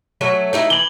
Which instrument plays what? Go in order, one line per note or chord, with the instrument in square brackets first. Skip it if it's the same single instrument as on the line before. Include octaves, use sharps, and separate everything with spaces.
[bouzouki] F#3 A3 C#4
A3 D#4 E4
[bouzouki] E3 [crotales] F#7 G7